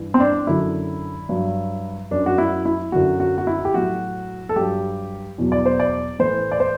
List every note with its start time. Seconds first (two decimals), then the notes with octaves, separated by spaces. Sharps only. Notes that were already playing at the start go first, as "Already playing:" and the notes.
Already playing: G2 E3
0.14 C4
0.20 D4
0.47 F#2 D3 F#3 E4
1.29 G2 F#3
2.11 F#2 F#3 D4
2.26 F#4
2.38 E4
2.65 E4
2.92 F#2 D3 F#3 F#4
3.20 F#4
3.38 F#4
3.47 E4
3.65 G4
3.74 A2 F#3 F#4
4.49 A4
4.56 G2 F#3 G4
5.38 E2 B2 F#3
5.52 D5
5.66 C5
5.80 D5
6.19 A2 E3 C5
6.52 D5
6.60 C5